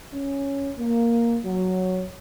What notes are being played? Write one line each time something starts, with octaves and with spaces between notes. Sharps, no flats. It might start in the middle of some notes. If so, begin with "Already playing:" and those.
C#4
A#3
F#3